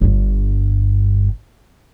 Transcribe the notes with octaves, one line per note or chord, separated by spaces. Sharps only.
G1 G2